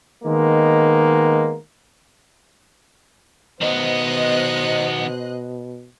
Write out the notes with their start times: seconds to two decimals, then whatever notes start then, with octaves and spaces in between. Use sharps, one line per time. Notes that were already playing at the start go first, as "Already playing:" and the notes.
0.25 D#3 G#3 A#3 B3
3.61 B2 D#3 B3 C5 D#5 F#6